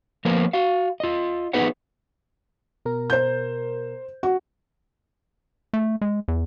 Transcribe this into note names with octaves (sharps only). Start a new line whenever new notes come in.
F3 A#3 B3 A#4 C#5
F#4 F5
F4 D#5
B3 D#4 G#4 B4 C#5 F#5
B2 A#4
C5 G6
F#4
A3
G#3
E2